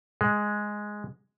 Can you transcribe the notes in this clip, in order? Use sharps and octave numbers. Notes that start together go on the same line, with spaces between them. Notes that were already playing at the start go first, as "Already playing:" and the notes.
G#3